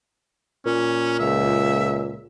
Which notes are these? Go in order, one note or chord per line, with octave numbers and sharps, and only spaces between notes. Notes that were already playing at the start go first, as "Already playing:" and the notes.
A#2 C#4
C#2 E5